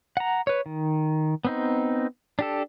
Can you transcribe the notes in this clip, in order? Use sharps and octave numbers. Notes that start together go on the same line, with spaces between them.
F#5 A#5
B4 C#5
D#3
B3 C4 D#4
D4 G4 A4